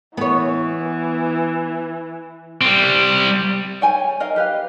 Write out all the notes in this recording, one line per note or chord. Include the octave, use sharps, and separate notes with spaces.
E3 B3 C#5
G3 C4
C#5 G5 G#5
A#4 D#5 F5
G4 B4 F5